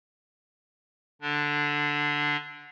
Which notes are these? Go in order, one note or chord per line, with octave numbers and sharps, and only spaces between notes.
D3 D4